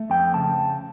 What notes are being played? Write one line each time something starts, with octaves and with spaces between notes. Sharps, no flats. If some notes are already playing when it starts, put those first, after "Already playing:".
Already playing: A3
F2 G5
C#3 A5